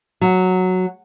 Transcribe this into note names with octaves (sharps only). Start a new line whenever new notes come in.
F#3